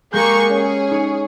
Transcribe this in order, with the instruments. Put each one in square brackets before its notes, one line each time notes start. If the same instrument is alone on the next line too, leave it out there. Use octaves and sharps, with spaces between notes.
[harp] G#3 G4 G6 [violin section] A#3 G#4 C#6
[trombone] C#4 [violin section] G#4
[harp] D#4 C#5